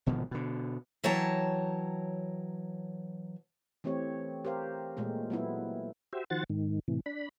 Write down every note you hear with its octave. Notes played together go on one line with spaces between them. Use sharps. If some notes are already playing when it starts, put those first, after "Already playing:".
G#1 B2 D3 F3
B2 D3
E3 F#3 C#5 G5 A5 A#5
E3 A3 C4 G4 C#5
G4 A#4 C5 F5
A#2 G#3 A3
F#3 B3 E4
F#4 G4 C5 E5
D#3 F3 F#4 C5 F#5 A6
G#2 D#3
A2 C3 E3
D4 B5